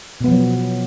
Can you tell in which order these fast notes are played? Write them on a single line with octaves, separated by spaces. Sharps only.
B2 B3 F3 F#3